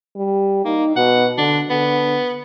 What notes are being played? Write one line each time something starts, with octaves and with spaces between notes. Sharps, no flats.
G3
A#3 D#4
B2 F#5
D3 D4
D3 B3